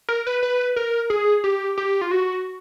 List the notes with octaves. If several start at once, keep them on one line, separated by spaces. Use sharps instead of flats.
A#4
B4
B4
A#4
G#4
G4
G4
F4
F#4